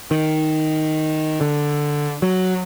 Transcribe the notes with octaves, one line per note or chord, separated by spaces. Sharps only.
D#3
D3
F#3